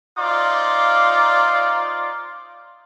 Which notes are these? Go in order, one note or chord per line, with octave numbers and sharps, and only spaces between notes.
D#4 F4 C5 D5 C6 D6